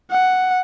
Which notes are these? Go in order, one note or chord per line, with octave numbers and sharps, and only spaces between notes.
F#5